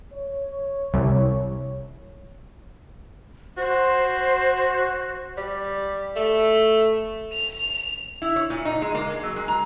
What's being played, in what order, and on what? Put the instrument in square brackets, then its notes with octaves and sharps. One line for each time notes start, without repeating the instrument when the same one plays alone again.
[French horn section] C#5
[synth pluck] C2
[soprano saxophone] F#4 [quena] C5
[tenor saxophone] G3
A3
[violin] F7
[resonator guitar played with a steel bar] E4
C#5
A#2
D#4
G#3
A#3
G#4
F#3
G#3
A#5